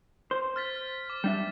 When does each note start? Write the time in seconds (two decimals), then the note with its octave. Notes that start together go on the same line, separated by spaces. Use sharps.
0.31 C5
0.56 F6 A6 B6
1.10 D6
1.24 G3 D4 E5